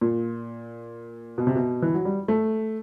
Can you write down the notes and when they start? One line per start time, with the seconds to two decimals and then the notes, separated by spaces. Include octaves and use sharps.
0.01 A#2
1.38 B2
1.47 C3
1.55 B2
1.82 E3
1.94 F#3
2.05 G3
2.28 A3